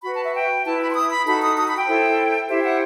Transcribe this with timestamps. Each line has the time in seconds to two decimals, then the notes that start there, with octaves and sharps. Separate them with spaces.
0.03 F#4 B4 B5
0.13 A5
0.24 E5
0.33 G5
0.64 E4 B4 A5
0.80 B5
0.90 C6
0.94 D#6
1.10 B5
1.25 D#4 F#4 A4 B5
1.41 D#6
1.56 D#6
1.66 B5
1.77 G5
1.87 E4 A4 C5
2.47 E4 G4 C5 E5
2.63 F#5